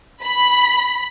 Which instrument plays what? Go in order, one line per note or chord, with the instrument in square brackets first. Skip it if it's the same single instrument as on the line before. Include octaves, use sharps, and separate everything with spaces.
[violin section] B5